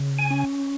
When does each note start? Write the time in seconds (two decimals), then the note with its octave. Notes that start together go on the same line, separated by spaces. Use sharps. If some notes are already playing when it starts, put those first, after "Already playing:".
Already playing: C#3
0.19 G#5
0.31 C#4